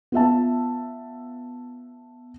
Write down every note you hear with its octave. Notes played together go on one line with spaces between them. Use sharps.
B3 F4 E5 A5